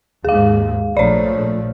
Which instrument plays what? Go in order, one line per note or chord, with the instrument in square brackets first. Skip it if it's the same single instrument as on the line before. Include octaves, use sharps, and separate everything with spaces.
[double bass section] D#2 G#2 [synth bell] G#4 F5
[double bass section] A#1 F3 A3 [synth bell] C#5 D5